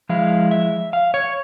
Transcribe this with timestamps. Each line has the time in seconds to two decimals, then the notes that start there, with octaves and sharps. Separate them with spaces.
0.09 F3 G#3 E4 F5
0.51 E5
0.93 F5
1.14 C#5